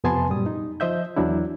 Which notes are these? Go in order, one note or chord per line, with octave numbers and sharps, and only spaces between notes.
F2 C3 B3 G#5 A5 C6
F#2 A#2 G3 D#6
D#4
F3 C5 D#5 E5 G6
E2 E3 F#3 D4 E4